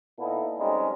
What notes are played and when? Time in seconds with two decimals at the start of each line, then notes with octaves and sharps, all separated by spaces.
0.19 A#2 B3 D#4 E4 A4
0.58 F2 G3 G#3 C#4 D#4